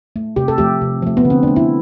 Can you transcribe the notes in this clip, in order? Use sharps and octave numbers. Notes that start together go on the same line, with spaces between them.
A3
C3 G4
A4
F3 A3 G4
C3
F3 A3
B3
D3
C4
A3 D4
E4